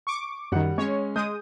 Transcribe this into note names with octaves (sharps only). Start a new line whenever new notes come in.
C#6 D6
F#2 D#3 G3 F#5
G#3 C#4 C#5
G#3 D#6 G6